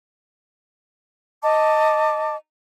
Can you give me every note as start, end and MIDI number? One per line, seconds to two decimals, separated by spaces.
1.43 2.36 75
1.43 2.36 81
1.43 2.36 86